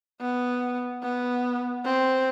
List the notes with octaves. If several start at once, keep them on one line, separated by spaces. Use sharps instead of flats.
B3
B3
C4